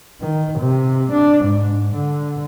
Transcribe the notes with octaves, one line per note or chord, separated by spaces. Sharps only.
D#3
C3
D4
G#2
D3